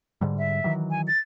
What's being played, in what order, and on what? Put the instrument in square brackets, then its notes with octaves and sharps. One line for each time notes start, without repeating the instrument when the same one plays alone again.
[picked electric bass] G#2 D3 G3
[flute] E5
[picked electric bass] D#3 E3 F#3
[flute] G#5
A6